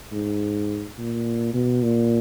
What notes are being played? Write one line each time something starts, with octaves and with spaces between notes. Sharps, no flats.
G#2
A#2
B2
A#2